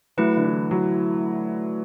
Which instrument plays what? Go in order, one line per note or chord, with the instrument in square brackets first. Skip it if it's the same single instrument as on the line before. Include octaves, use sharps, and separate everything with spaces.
[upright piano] F#3 [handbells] A3 E4 B4
[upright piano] D3
E3
F#3